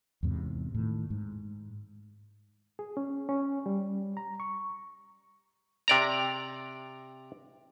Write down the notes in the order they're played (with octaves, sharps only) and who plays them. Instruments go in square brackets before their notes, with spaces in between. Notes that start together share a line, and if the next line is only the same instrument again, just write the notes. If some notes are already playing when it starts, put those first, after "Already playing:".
[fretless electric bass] E2 G#2 C3
A2 D#3
G#2
[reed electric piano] G#4
C#4
C#4
G3
A#5
C#6
[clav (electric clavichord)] C3 D5 A#5